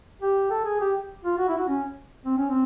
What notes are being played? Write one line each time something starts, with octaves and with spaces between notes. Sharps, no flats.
G4
A4
G#4
G4
F4
F#4
E4
F#4
C#4
C4
C#4
C4